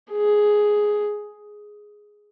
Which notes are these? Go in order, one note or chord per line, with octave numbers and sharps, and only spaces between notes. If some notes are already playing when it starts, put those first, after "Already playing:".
G#4